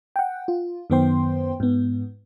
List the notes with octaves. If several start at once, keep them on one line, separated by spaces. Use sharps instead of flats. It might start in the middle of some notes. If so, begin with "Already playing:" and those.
F#5 G5
F4
F#2 D#3 B3 C5 G5 C6
G#2 B3